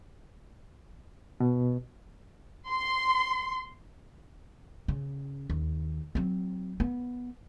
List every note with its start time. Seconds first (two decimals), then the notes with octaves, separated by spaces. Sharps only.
1.40 B2
2.69 C6
4.88 C#3
5.50 D#2
6.15 F#3 C4
6.80 B3